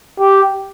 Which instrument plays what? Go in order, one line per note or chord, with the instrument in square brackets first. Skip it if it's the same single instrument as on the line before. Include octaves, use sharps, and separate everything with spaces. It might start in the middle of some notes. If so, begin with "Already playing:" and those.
[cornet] G4